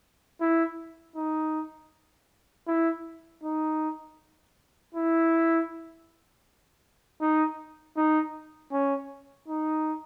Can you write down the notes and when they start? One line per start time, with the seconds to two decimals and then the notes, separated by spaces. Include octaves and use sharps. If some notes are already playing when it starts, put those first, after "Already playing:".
0.41 E4
1.16 D#4
2.67 E4
3.43 D#4
4.95 E4
7.21 D#4
7.97 D#4
8.72 C#4
9.48 D#4